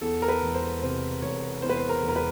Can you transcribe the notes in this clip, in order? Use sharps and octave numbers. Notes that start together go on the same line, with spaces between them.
E2 A4
A#4
B4
E1
C5
C3 C5
E1 C#5
E2 C5
B4
C5
A#4
E1
A#4
B4